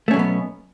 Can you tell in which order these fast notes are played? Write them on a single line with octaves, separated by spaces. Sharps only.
A3 C#4 F#3 B2 B3